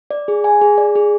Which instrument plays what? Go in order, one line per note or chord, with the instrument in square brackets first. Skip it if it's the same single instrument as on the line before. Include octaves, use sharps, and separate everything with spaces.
[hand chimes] D5
G#4
G#5
G#4
D5
G#4